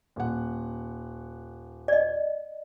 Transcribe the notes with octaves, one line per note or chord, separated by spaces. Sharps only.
D#1 F#5
D5 D#5